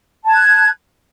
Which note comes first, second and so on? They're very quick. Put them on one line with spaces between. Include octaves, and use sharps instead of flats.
A5 G#6 F#6